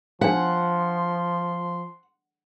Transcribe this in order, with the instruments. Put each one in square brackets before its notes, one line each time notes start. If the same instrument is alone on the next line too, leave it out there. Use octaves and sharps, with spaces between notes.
[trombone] F3 [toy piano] D4 F5 [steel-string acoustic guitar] F#5 [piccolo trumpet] C6